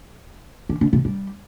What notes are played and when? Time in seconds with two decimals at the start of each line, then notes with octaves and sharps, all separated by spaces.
0.69 D3
0.81 D3
0.93 C3
1.05 G3